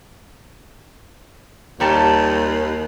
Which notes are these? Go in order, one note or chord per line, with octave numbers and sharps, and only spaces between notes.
D#2 A#2 G3 A5